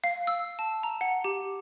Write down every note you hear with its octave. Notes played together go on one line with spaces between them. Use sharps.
F5
E6
A5
A#5
F#5
G4